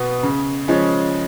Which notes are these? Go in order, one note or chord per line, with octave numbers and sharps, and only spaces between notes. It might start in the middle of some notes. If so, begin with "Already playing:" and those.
Already playing: B2 B3
C#3
F3 G#3 C#4